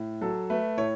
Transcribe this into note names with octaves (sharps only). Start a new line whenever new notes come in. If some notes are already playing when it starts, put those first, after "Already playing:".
Already playing: A2
F#3 A4
A3 B4
A2 C#5